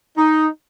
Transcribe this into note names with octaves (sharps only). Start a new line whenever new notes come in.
D#4